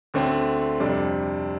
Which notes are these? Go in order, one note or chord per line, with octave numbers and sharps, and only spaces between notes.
D2 D3 A3 C4
F2 C3 G3 D4